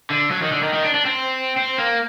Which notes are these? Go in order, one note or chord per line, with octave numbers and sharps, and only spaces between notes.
D3
F#3
D#3
D3
D#3
D#3
D4
D4
C4
C4
A#3